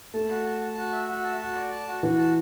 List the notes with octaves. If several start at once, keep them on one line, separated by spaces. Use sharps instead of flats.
A3 A5
F#4
A5
A5
F#4
E5
F#4
A5
F#4
D5
A5
F#4
E3 F#4
A5